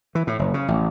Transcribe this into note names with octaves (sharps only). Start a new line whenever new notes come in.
E3
A2
F#1
C#3
A1